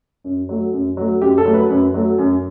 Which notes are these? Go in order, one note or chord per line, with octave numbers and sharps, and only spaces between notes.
F#2
F#3 A3
F#2
F#3 A3
F#2 G4
A4
F#3 A3
B4
F#2
F#3 A3
F#2